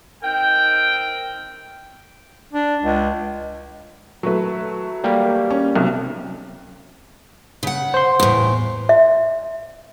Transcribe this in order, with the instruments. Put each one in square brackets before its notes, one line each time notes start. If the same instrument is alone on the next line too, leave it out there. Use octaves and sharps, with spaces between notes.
[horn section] C4 D#4 A#4 G5
[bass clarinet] D4
C#2
[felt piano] F#3 A3 B4
[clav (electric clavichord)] G3 A#3 G4
[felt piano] C#4
B1 C3
[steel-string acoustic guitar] C#3 F#5
[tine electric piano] C5 C6
[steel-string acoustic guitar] E2 A2
[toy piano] E5